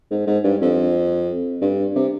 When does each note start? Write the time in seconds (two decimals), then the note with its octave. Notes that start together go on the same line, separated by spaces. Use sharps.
0.11 G#2
0.27 G#2
0.44 G2
0.61 F2
1.62 G2
1.95 C3